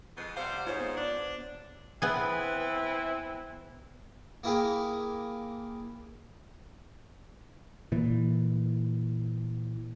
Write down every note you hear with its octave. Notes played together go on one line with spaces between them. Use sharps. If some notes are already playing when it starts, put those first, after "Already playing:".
F2 G#3 B3 C7
C3 G3 C5 F5 F#5
G#2 F4 C5 C#5
B3
D4
E3 B3 C4 E4 G#4
A#3 E4 G4 G#4
A#2 E3